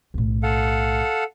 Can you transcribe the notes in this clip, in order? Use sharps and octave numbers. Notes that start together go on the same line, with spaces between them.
B1 A2
A4 F5 F#5